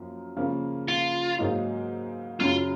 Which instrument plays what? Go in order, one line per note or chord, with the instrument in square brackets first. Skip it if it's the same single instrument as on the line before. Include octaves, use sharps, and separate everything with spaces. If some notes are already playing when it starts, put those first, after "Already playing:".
Already playing: [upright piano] F#2 F3 A#3
C#3 F3 A#3
[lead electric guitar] F4
[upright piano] G#2 F#3 A#3 D#4
[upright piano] F#2 C#3 F#3 [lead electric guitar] F4